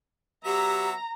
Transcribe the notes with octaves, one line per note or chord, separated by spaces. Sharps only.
F#3 B3 G4 E5 A#5